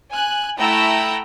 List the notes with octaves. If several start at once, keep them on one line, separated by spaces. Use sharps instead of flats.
G#5 F#6
A3 E4 F#5 G5 A#5 E6